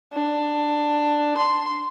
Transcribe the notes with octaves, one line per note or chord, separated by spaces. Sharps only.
D4
C6